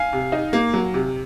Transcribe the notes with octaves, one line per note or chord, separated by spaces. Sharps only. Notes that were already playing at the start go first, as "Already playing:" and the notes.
Already playing: F5 G#5
C3
D#4
A#3
F#3
C3